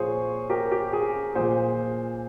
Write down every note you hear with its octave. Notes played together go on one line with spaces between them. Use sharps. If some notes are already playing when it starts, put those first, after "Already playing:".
Already playing: A#2 F3 G#4 C5 C#5 F5
G4 A#4
G4
G#4
A#2 F3 G#4 C5